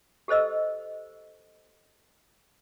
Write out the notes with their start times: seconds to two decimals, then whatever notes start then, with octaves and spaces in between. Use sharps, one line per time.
0.28 G4 A4 C5 D#5 E6